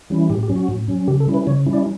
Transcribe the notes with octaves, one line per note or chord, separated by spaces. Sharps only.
E3 G3 C#4 E4
A2 G4
G4
F#3 C#4
F#4
A2
F#3 C#4
C#3 G4
A4
G3 C#4 E4
B4
C#3 C#5
G3 C#4 E4
D5